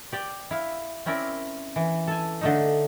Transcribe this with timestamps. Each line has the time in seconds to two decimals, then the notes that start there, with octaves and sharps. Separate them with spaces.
0.12 G4 D5 G5
0.51 E4 F5
1.06 C4 C#4 E4 A#4 D5
1.76 E3
2.07 A4 G#5
2.41 D3 A3 D#4